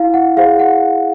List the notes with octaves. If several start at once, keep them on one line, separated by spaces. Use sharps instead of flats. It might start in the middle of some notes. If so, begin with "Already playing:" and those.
Already playing: E4 F5
F#5
G#4 C5 F5
F#5